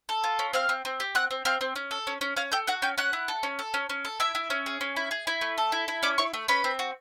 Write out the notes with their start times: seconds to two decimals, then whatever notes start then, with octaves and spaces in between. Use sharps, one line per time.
0.09 A4
0.24 F4
0.39 C#4
0.53 C4 F5 F6
0.69 C4
0.85 C4
1.00 G4
1.15 C4 F#5 F#6
1.31 C4
1.45 C4 F5 F6
1.61 C4
1.76 C#4
1.91 A4
2.07 C#4
2.21 C#4
2.36 C#4 F5 F6
2.52 A4 G5 G6
2.67 F#4 F#5 F#6
2.82 C#4 G5 G6
2.98 C#4 F#5 F#6
3.13 E4
3.28 A4
3.43 C#4
3.59 A4
3.74 C#4
3.89 C#4
4.05 A4
4.20 E4 E5 E6
4.35 E4
4.50 C#4
4.66 G#4
4.81 C#4
4.96 E4
5.11 G#4
5.27 E4
5.41 A3
5.58 A4
5.72 E4
5.88 E4
6.03 C#4 D5 D6
6.18 E4 C#5 C#6
6.34 A3
6.48 C#4 B4 B5
6.64 C4
6.79 F#4